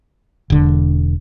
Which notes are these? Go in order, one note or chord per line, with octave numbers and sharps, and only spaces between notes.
E1 D3